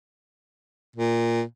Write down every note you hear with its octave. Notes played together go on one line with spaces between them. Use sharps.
A#2